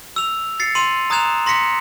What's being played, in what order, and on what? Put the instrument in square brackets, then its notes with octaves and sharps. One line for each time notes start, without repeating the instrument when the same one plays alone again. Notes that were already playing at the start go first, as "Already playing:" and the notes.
[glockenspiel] E6 F7
A6 C7 C#7
C6 D#7 F7
A#5 D#6 F#6 G#6 E7 F7
C6 A#6 B6 C#7